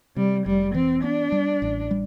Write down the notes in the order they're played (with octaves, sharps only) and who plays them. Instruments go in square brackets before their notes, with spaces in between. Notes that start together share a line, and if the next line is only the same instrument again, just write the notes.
[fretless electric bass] C3 [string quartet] G3
[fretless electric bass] F1 [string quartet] G3
[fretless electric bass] E3 [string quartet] C4
[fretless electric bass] B3 [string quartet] D4
[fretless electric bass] G3
A1
G3